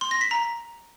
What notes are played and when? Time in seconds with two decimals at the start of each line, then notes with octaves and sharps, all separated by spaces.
0.01 C6
0.11 A#6
0.21 B6
0.31 A#5